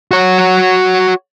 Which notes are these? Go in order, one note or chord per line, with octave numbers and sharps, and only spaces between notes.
F#4 C#5